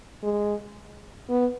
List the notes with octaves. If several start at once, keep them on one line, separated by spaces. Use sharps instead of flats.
G#3
B3